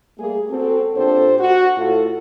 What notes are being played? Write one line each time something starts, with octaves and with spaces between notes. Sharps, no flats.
G3 A3 A#3 G#4
C4 F#4 A4
A#2 C4 D4 G4 A4 C5
F#4
A2 F4 F#4 A4